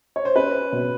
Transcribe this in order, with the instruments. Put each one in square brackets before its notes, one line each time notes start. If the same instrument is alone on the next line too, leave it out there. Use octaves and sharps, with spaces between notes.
[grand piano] C#5
C5
[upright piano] C#4 [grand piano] B4
[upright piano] B2